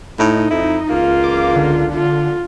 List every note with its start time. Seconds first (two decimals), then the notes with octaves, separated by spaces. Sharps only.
0.20 A2 D#4
0.51 F2 E4
0.90 C#2 A#3 F4
1.24 D6
1.56 D3
1.93 F4